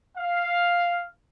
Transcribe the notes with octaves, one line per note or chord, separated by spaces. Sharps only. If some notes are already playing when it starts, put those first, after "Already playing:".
F5